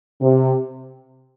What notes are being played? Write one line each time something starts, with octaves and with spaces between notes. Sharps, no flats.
C3